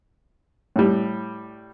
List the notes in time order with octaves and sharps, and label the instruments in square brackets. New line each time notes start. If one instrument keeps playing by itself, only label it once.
[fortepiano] A2 G3